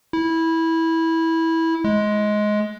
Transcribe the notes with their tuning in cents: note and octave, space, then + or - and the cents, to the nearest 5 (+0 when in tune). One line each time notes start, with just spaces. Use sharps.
E4 -15
G#3 +15